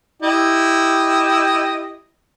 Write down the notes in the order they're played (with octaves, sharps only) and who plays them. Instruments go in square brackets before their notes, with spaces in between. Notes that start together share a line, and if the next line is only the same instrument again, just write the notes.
[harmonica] E4 G4 D#5